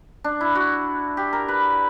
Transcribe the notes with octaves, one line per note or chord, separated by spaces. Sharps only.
D4
E4
F#4
G4
A#4
B4